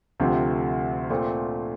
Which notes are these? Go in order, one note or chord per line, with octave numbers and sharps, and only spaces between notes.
D2 C3 F3 A3 C4
A#2 A3 C4